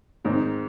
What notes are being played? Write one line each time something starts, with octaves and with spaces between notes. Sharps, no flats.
G#2 D#3 G#3 C4 D#4